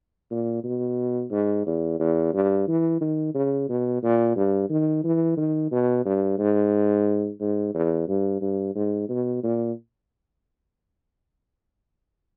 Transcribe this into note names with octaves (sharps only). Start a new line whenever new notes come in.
A#2
B2
G#2
E2
E2
G2
E3
D#3
C#3
B2
A#2
G2
D#3
E3
D#3
B2
G2
G#2
G#2
E2
G2
G2
G#2
B2
A#2